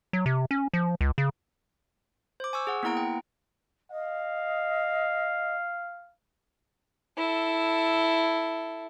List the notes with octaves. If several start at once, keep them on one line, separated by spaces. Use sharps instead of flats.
F#3
C3
C#4
F3
C#2
C#3
C5 D6
G#5 C#6 E6
G#4 F#5
A#3 B3 E4 F#5 A#5 D7
G5
D#5 F5
E4 A4